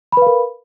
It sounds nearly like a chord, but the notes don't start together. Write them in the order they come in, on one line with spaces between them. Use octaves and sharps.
B5 B4 F5 A#4